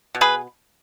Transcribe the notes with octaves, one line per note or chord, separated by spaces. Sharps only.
B2
G#4 B4